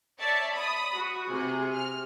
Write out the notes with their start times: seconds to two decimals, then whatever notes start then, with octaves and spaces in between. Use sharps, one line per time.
0.20 C#5 D5 E5 A5
0.54 B5 D#6
0.96 F#4
1.30 C3 G#4
1.74 F6